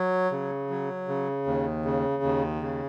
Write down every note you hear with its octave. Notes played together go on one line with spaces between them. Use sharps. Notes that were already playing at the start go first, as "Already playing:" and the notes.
Already playing: F#3
C#3
F#3
C#3
D#2
C#3
D#2
C#3